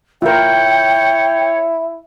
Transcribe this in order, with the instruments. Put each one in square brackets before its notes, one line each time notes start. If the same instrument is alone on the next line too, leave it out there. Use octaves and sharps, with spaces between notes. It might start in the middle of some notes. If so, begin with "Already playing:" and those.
[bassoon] E4 [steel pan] F4 A#4 [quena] C#5 [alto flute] G5